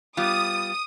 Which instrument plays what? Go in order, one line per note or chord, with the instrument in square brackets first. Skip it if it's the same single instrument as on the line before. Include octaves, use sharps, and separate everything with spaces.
[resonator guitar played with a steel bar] G3 B3 F4 [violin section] D#6